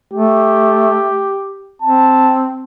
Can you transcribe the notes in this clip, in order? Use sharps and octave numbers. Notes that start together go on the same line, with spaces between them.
A3 G4
C4 A5